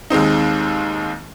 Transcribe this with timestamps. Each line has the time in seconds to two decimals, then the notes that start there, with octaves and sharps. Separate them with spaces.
0.10 D#2 G#3 C4 D#4